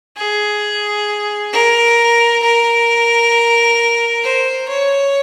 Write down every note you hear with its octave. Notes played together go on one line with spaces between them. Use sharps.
G#4
A#4
A#4
C5
C#5